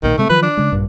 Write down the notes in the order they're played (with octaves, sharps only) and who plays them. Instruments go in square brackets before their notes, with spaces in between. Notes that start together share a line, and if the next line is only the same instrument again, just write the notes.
[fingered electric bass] B1 A#2 [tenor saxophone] D#3
[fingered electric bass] C3 G#3 C4 [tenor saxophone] A3
[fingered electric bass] D#3 F3 F#3 [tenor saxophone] B4
[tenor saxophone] D4
[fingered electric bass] C#3 G#3
A#1 G2